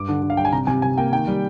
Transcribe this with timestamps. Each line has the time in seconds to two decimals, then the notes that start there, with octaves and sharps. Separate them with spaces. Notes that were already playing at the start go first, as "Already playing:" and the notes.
Already playing: G2 D6
0.08 D3
0.22 D3
0.30 F5
0.37 G3 G5
0.45 G#5
0.52 C3 A#5
0.67 C3 G#5
0.82 C3 G#5
0.98 A#3 G5
1.12 D#3 G5
1.27 G3